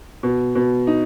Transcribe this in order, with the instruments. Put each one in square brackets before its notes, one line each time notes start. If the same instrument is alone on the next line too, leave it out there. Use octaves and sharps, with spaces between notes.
[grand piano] B2
B2
D#4